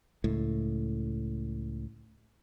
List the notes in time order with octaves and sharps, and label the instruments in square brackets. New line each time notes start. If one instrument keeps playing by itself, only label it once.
[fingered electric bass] C#2 A2